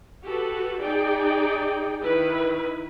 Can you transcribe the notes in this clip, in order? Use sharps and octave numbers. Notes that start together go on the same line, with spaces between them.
F#4 G4 A4 B4
D#4 G#4 D5 G5
D#3 E4 B4